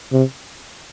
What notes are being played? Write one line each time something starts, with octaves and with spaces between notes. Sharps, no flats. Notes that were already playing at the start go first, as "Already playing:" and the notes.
C3